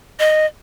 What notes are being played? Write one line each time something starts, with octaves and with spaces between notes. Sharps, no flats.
D#5